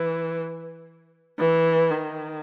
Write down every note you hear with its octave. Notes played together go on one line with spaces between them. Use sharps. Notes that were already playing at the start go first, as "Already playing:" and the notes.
Already playing: E3
E3
D#3